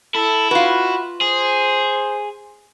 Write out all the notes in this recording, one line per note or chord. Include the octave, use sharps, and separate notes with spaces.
E4 A4
F4 F#4 B4
G#4 C5